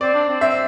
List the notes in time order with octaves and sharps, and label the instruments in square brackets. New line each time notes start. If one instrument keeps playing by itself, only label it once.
[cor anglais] C4 [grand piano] D5
[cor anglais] D4
C4
[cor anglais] C4 [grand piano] E5